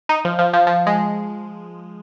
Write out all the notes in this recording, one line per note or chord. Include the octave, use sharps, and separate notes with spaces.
D#4
F3
F3
F3
F3
G#3